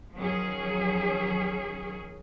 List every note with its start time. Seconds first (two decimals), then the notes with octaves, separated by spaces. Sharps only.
0.16 D#3 F3 F#3 C#4 G#4